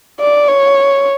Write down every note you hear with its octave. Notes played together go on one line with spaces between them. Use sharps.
D5
C#5